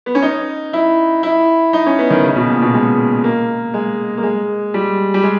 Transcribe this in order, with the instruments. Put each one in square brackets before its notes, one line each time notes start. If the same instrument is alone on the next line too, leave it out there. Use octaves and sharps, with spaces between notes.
[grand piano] B3
C#4
D#4
E4
E4
D#4
C#4
B3
D#3
C#3
B2
A#2
B2
G#3
A#3
G#3
A#3
G#3
G3
G3
G#3